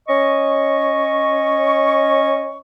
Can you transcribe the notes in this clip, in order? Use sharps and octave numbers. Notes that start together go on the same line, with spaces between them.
C#4 D#5 C#6